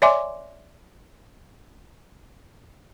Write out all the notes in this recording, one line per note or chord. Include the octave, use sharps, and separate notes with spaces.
C#5 D5 E5 G#5 C6 D6